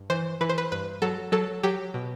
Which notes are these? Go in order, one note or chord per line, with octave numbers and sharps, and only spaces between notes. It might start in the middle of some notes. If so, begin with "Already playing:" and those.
Already playing: G2
E3 C5
E3 B4
C5
B4
G2 B4
F#3 A4
F#3 A4
F#3 G4
B2